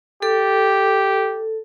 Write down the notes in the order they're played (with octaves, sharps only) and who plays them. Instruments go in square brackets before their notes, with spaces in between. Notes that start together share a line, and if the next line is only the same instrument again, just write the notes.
[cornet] G4 [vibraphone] A4